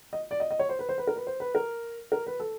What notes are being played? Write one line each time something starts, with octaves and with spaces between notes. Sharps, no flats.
D#5
D5
D#5
D#5
C#5
C5
B4
C5
B4
A#4
B4
C5
B4
A#4
A#4
B4
A4